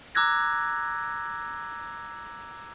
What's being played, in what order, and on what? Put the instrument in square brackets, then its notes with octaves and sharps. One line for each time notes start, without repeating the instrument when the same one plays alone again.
[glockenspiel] A#5 D6 E6 F#6 G#6 A#6